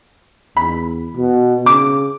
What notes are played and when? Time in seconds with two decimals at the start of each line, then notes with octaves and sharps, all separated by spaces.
0.57 E2 B5
1.17 B2
1.66 C#3 D6